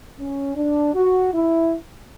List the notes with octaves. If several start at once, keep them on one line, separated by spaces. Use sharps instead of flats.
C#4
D4
F#4
E4